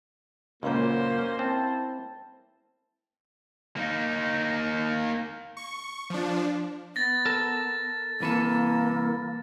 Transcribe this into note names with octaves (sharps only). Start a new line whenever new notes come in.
C#2 F#2 A#2 A#3 C#4 C5
C4 E4 A5
A#3 D#4
C#6
F3 D4
B3 A6 A#6
A4 A#4 A5
C2 E3 A#3 A4